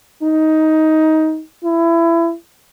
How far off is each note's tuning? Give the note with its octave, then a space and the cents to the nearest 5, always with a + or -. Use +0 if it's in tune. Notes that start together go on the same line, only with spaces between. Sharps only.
D#4 +15
E4 +25